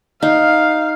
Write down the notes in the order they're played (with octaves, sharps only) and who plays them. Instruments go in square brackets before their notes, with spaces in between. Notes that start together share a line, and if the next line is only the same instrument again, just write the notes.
[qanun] D#4 [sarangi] F5